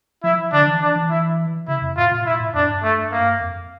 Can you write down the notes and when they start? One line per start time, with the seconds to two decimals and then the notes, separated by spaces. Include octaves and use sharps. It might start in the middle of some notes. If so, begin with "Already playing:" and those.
0.23 F3 E4
0.52 D3 D4
0.67 E3
0.82 D4
0.96 E3
1.10 E4
1.68 C#3 E4
1.82 F2
1.97 A2 F4
2.11 A#2
2.25 A#2 E4
2.40 A2
2.54 F2 D4
2.69 G2
2.83 A3
3.12 A#3
3.41 F2